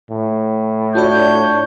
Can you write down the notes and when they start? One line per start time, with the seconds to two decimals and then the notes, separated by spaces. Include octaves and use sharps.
0.11 A2
0.95 D4 F4 F#4 C#5 D5 G6